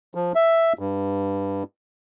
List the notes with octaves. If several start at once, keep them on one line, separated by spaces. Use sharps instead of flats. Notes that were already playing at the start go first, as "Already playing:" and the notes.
F3
E5
G2